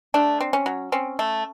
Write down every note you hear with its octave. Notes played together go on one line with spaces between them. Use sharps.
A3 D4
C4
C#4
F#3
C4 C#4
A3